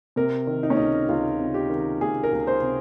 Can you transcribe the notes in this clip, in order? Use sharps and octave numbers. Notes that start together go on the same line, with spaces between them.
C3 A#4
D#3
D#4
C#4
C#2 D#4
C#2 F4
C3
G4
D#3
C#2 G#4
A#4
C#2
C5
C3